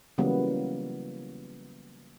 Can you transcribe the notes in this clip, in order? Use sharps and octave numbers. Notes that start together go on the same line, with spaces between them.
C#3 E3 F#3 G3 A#3 B3